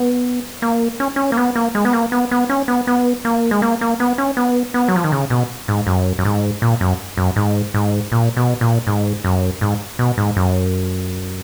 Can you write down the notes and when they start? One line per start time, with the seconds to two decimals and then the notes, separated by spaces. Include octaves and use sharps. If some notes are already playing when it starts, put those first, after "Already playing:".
Already playing: B3
0.62 A#3
1.00 C#4
1.16 C#4
1.32 A#3
1.37 B3
1.55 A#3
1.75 G#3
1.85 B3
1.93 A#3
2.12 B3
2.31 B3
2.49 C#4
2.68 B3
2.87 B3
3.25 A#3
3.51 G#3
3.62 A#3
3.81 A#3
4.00 B3
4.18 C#4
4.37 B3
4.74 B3
4.88 F#3
4.96 F3
5.04 D#3
5.12 C#3
5.30 B2
5.68 G#2
5.87 F#2
6.19 F#2
6.25 G#2
6.62 A#2
6.81 F#2
7.17 F#2
7.36 G#2
7.74 G#2
8.12 A#2
8.37 B2
8.61 A#2
8.87 G#2
9.24 F#2
9.61 G#2
9.99 B2
10.18 G#2
10.36 F#2